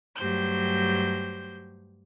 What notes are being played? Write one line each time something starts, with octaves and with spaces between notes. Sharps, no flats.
G2 F#3 A3 G4 C5 G6